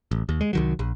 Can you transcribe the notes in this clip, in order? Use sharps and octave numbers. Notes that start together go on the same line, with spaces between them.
A1
D#2
G#3
C2 D#3 F#3
A#1